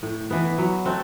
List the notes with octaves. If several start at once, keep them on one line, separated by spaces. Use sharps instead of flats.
A2
E3 B3
F#3
A3 C4 F#4